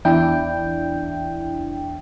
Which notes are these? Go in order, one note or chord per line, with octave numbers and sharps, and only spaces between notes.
E2 D4 E4 G5